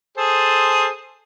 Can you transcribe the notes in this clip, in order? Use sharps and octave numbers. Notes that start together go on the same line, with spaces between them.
G#4 A4 C5